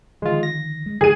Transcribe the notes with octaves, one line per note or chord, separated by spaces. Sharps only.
D3 D#3 F3 G#3 F4
A#6
G#3
C#3 F3 G#3 G#4 D#7